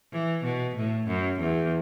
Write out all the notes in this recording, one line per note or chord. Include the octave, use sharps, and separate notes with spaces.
E3
B2
A2
F#2
E2